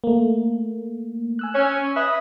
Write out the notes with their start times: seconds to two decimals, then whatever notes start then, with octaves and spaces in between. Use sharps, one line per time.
0.04 A3 A#3
1.39 G#5 E6 F#6
1.55 C#4
1.97 B4 D#5 E5